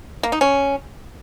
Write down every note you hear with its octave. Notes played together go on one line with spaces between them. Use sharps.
A#3
D#4
C#4